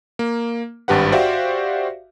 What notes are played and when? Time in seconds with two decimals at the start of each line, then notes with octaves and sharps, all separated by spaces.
0.19 A#3
0.88 G#1 G2 G4 B4 F#5
1.12 F#4 G4 C5 D5 E5 F5